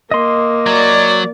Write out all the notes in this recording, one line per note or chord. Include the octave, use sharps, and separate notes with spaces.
A#3 D#5 C6
F#3 D5